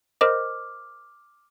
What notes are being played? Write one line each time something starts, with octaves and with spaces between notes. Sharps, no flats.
A#4 C5 D#5 D6 F6